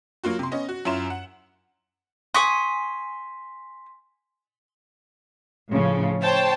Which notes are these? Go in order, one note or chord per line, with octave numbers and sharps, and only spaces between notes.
F#3 A#3 F4 F#4
C3 C6
B3 C#4 D#5
F#4
F#2 C#4 E4 F4 C6 E7
F#5
G#5 C6 C#6 D#6 B6
A2 C#3 F3
C5 C#5 G5 A5